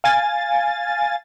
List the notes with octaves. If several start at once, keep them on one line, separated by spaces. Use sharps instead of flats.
F5 G#5 A6